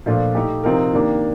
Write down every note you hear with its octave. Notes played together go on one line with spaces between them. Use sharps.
A#2 F3 A3 D4 F4
A3 D#4 G4
C3 F3 C4 D#4 A#4
D#3 A#3 D4 G4